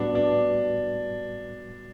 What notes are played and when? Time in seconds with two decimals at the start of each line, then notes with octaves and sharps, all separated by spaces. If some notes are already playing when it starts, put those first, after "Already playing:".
Already playing: A2 G3 B3 D4 F#4 B4
0.15 D4